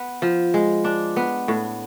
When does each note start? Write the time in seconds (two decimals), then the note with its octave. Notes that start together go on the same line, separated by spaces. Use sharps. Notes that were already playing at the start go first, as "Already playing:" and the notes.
Already playing: B3
0.22 F3
0.54 G#3
0.85 D4
1.17 B3
1.48 A2